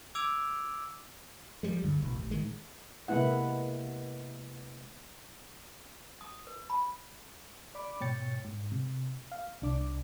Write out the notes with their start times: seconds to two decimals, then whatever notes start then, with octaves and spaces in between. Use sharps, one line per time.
0.15 D6 E6 G#6 D7 F7
1.63 F3 G3 G#3
1.82 D2 G2 D3
2.02 E1 A1
2.18 A1
2.31 A2 D#3 G#3
3.08 C3 G#3 A#3 B3 E4 F#5
6.21 D#6
6.47 B4
6.70 B5
7.75 D5 B5 D6
8.01 G#2 B2 C#5 G5 A6 C#7
8.45 G#2
8.72 C3
9.32 F5
9.62 C2 D4 D6